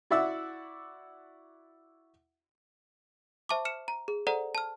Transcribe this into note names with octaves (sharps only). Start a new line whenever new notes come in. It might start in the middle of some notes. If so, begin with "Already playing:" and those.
E4 F#4 D5 E5 F#5 E6
C5 E5 A5 C#6 D6
F6 C#7 E7
A#5
G#4
A4 C5 D5 F#5 A#5
A5 F6